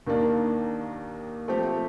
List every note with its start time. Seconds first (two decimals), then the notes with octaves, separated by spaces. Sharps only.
0.07 D#2 D#3 A#3 D4
1.48 F3 A3 C4 G4